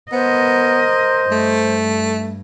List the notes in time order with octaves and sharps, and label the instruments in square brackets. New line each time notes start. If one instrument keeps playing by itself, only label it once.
[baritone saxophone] B3 [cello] A#4 D#5 [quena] C5
[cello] G2 [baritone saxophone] A3